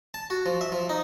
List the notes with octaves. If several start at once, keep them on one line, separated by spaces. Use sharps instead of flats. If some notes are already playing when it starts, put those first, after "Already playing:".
A5
F#4
F3
E5
F3
D#4